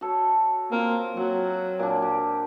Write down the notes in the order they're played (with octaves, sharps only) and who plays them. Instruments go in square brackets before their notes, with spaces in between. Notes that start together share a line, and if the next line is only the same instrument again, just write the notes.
[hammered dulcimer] F#4 A4 C#5
[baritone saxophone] A#3 [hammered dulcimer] C4 F4
[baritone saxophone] F#3 [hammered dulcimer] F#4
[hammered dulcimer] A#2 D4
G4